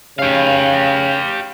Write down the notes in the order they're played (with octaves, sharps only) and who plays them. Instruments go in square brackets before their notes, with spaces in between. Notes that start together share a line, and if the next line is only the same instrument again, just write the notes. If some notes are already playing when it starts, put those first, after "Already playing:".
[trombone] C#3 [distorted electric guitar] G4 F5